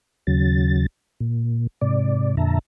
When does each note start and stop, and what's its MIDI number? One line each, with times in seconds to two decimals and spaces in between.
0.27 0.86 39
0.27 0.86 49
0.27 0.86 54
0.27 0.86 93
1.20 1.67 46
1.81 2.35 44
1.81 2.35 48
1.81 2.35 74
2.37 2.59 41
2.37 2.59 46
2.37 2.59 50
2.37 2.59 76
2.37 2.59 81
2.37 2.59 82